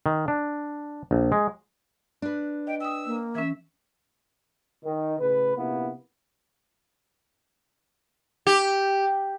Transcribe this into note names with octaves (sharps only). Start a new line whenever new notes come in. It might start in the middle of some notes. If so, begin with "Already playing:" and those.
D#3
D4
A#1
G#3
D4 B4
D#5 G5
G5 D#6 E6
A#3
E3 C#4 E5
D#3
A2 C#3 B4
A#1 C3 A#3 B3 E4
G4